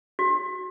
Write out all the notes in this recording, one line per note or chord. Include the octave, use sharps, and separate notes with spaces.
F#4